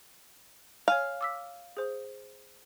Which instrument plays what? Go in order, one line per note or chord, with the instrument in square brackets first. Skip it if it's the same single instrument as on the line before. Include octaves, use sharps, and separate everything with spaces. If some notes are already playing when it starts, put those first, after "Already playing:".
[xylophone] C#5 G#5 F6 [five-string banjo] F5
[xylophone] D6 E6 B6
G#4 C5